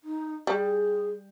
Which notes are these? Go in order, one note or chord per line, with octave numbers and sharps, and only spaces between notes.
D#4
G3 G#4